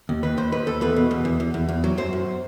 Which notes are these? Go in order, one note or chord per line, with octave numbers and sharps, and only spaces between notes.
D#2
D#2 B4
D#2 C5
D#2 B4
D#2 A4
E2 B4
B2
E2
E2
E2
E2
E2
F#3
F#2 C5
F#2